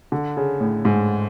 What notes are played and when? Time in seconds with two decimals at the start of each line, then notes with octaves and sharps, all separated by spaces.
0.12 D3
0.37 C#3
0.60 A2
0.85 G#2